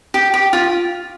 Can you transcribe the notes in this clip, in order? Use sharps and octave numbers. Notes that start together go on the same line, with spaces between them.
G4
G4
F4